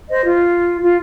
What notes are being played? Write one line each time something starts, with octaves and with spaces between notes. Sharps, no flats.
C5 D#5
F4
F4